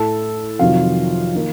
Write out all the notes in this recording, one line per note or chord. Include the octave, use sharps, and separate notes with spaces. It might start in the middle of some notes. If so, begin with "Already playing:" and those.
Already playing: A2 A3 A4 A5
F2 C3 D#3 F#3 F4 F5
D#3 A#3